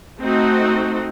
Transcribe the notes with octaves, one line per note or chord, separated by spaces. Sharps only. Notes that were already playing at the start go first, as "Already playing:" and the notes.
A3 C4 D#4 F#4